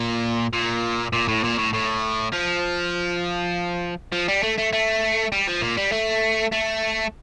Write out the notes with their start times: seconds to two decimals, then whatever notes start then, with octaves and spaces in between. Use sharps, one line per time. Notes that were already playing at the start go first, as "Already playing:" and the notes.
Already playing: A#2
0.53 A#2
1.13 A#2
1.28 A2
1.44 A#2
1.59 A2
1.74 A2
2.33 F3
4.12 F3
4.28 G3
4.43 A3
4.58 A3
4.73 A3
5.32 G3
5.48 F3
5.62 A#2
5.77 G3
5.92 A3
6.52 A3